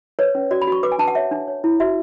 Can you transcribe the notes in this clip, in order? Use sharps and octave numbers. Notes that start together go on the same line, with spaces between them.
B4 C#5
C#4
F#4 D5
B5
F#4 C#6
B4 D6
G#5
D4 A5
F#5
C#5 E5
D4
C#5
E4
F#4 E5